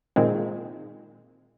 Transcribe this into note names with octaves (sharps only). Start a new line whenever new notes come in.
A#2 D#3 G#3 C4